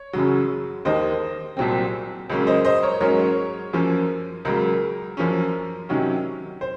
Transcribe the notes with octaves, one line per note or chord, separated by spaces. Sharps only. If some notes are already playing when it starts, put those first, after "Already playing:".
Already playing: C#5
F#2 C#3 F#3
D#2 D#3 A#3 C5 D#5
C2 A#2 F#3 C4
C#2 C#3 F#3 A#3 C#4
C5 D#5
C5 D#5
A#4 C#5
G#2 F#3 A#3 C#4 A#4 C#5
F#2 F3 A#3 C#4
C#2 C#3 F#3 A#3 A#4
F#2 F3 A#3 C#4
C3 D#3 F#3 C#4
C5